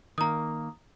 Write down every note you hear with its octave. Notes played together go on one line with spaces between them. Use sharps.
D#3 A#3 A#5 D#6